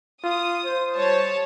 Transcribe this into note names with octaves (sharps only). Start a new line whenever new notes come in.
F4 D#6
C5
G3 C#5 A5